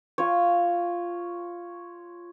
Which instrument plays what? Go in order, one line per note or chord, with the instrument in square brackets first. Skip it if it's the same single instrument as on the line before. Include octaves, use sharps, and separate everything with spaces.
[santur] F4 C#5